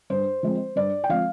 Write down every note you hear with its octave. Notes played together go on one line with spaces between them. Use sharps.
G2 C5
F3 G#3 C4
G2 D5
G5
F3 G#3 C4 F5